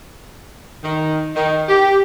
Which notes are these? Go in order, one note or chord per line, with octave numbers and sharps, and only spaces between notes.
D#3
D#3
G4